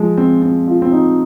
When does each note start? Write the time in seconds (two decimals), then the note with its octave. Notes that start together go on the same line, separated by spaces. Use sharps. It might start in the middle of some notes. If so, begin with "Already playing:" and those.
Already playing: F3 G#3
0.18 C4
0.42 C4
0.68 F4
0.82 C4
0.91 D#4